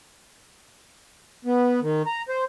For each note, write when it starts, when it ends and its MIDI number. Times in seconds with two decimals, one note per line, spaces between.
1.45 1.80 59
1.82 2.02 51
2.07 2.22 82
2.29 2.44 72